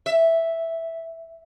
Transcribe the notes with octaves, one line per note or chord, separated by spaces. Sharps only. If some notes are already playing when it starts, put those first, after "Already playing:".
E5